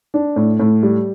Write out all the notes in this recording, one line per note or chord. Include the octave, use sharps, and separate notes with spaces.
D4
A2
A2
G3